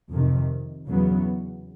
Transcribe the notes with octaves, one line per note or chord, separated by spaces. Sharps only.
F2 C3 D#3
E2 C#3 F#3 B3